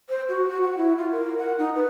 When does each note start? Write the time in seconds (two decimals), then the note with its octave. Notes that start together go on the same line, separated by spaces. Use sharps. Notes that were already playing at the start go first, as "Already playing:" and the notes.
0.09 C5
0.29 F#4
0.49 F#4
0.63 F#5
0.77 E4
0.98 F4
1.12 A#4
1.38 F#5
1.59 D#4
1.75 B4